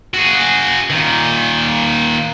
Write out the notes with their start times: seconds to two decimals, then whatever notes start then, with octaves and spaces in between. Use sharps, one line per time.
0.14 F#4 G#4
0.90 A#2 D#3